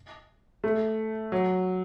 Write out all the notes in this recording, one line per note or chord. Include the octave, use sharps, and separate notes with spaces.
A3
F#3